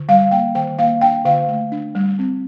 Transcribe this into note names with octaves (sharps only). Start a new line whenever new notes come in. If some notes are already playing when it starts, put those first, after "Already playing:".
Already playing: D3
G3 F5
A#3 G5
D#3 G5
A#3 F5
D4 G5
D3 F5
A3
D4
G3
C4